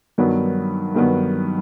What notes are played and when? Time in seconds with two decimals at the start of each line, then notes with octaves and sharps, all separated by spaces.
0.18 G2 D#3 F#3 B3
0.95 G2 D#3 F#3 B3